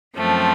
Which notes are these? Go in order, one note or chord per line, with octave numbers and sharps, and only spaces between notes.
F#2 F3 A3 C4